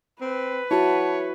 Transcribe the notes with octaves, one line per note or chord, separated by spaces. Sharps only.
C4 B4
E4 F#4 C#5 A5